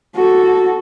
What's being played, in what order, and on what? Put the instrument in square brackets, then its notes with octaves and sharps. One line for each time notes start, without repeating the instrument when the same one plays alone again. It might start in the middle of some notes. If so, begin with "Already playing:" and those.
[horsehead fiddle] F#4 A4